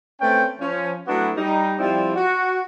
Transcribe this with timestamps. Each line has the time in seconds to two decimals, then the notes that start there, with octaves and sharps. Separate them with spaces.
0.21 A3 C4 C#4 B4 G5
0.60 F3 C#4
1.08 F#3 A3 B3 D4 E4 F#4
1.37 G3 D#4
1.79 F3 G3 C4 E4 F4 D5
2.16 F#4